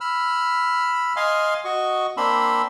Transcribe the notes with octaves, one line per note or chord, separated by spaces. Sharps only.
B5 E6 F6
D#5 F5 G#5 C6
F#4 D#5 C#6
A#3 C4 D4 B5 C6 E6